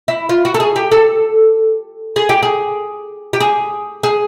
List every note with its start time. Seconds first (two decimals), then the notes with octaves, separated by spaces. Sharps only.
0.08 E4
0.29 F4
0.45 F#4
0.54 A4
0.60 G#4
0.76 G4
0.91 A4
2.16 G#4
2.29 G4
2.43 G#4
3.33 G4
3.40 G#4
4.03 G#4